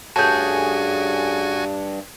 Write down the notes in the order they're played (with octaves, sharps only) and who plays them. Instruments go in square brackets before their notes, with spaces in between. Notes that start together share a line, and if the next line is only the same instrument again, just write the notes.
[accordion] G2 [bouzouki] A3 C#4 G#4 [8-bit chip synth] F#4 G#5 [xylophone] A5 G6